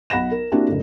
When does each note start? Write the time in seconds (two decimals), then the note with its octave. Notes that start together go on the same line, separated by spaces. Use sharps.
0.10 B1 F#5 B5 A#6 E7
0.31 A#4
0.52 A#3 C4 D4 E4 F#4 G4
0.68 F#1 A2